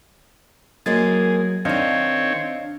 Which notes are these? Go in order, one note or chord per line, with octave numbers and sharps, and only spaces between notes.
F#3 G#3 A#3 G#4 D#5 A6
D#3 C4 D4 D#4 C#5 D#5 F5